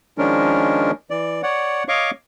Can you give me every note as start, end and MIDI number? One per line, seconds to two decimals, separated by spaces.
0.18 0.91 51
0.18 0.91 53
0.18 0.91 56
0.18 0.91 61
0.18 0.91 62
0.18 0.91 70
1.10 1.42 52
1.10 1.42 74
1.43 1.83 73
1.43 1.83 74
1.43 1.83 78
1.88 2.11 73
1.88 2.11 75
1.88 2.11 77
1.88 2.11 85
1.88 2.11 86